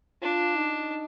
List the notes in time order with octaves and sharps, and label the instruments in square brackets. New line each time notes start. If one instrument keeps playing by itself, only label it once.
[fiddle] D4 [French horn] F4
[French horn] D#4